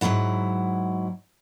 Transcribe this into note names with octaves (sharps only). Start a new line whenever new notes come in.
G#2 C#3 F#3 E4 F#5